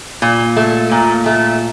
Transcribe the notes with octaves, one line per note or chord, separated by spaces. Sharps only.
A#2
A3
A#2
A3